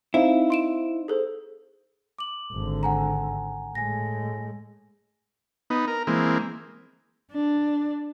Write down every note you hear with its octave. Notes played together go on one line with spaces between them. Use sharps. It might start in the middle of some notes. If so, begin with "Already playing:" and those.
C4 D#4 E4 F5
C6 D7 E7
G#4 A4 C5
D6 F#7
G#1 D3
F#5 G#5 A#5
A2 G#3 G#5 A#6
B3 D#4
A#4
E3 G#3 A#3 C4
D4